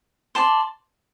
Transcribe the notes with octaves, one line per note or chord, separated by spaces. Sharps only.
D5 A5 C6